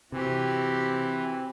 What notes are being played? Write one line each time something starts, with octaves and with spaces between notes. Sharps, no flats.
C3 E3 C4 F#4 G4